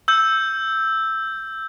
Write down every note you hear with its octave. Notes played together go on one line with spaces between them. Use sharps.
E6 G6